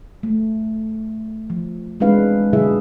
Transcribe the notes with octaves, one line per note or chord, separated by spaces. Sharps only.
A3
F3
G#3 C4 D4 E4 B4 F5
B2 D3 F#3 E4 G#4 E5